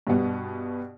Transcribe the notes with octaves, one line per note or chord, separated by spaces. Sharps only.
G2 B2 B3